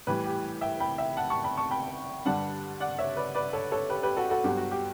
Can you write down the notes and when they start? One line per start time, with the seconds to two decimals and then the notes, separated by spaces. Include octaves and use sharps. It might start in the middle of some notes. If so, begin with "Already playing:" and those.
0.07 A2 E3 G3 G4 B4
0.25 G4
0.61 E5 G5
0.80 G5 B5
0.98 E5 G5
1.17 F#5 A5
1.30 A5 C#6
1.43 G5 B5
1.57 A5 C#6
1.71 G5 B5
2.25 G2 D3 G3 D4 F#5 A5
2.80 D5 F#5
2.99 C#5 E5
3.17 B4 D5
3.35 B4 D5
3.53 A4 C#5
3.72 A4 C#5
3.89 G4 B4
4.03 G4 B4
4.17 F#4 A4
4.30 F#4 A4
4.44 G2 F#3 B3 G4
4.57 F#4
4.71 G4